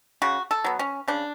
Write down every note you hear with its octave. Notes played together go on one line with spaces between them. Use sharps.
C#3 F#4
A4
F#3 B3
C#4
C#3 D4